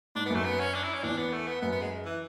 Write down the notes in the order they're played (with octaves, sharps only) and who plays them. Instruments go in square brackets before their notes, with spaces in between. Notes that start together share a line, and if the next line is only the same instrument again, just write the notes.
[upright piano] G#2 [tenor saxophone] D4
[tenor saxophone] B3
[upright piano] F#2 [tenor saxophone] A3
[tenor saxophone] B3
C#4
D4
E4
C#4
[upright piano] E2 [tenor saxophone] D4
[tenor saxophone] B3
A3
B3
[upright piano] F#2 [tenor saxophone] B3
[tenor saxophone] B3
G#3
E3